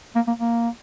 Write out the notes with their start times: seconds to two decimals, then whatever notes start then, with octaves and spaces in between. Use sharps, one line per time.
0.16 A#3
0.28 A#3
0.40 A#3